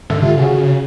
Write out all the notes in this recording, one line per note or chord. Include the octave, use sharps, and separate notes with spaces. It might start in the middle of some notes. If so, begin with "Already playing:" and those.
G#2 D3 A4 E5
F4 G4
C#3 F#4 G#4 F5